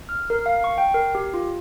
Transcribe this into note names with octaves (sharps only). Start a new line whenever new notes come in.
F6
A#4
F5
C#6
G5
A#4
G4
F4